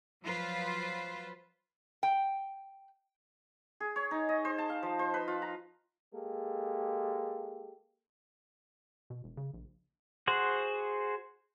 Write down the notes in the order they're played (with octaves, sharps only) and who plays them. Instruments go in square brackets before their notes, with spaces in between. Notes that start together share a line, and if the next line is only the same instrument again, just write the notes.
[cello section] F3 F#3 F4 B4 C5
[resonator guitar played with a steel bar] G5
[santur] G#4
C#5
D#4
D#5
C5
A5
F5
F3
C5
B4
F4
A#5
[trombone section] G#3 A#3 G4 A4
[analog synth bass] B2
E1
C#3
A#1
[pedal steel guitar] F#4 G#4 C5 F#5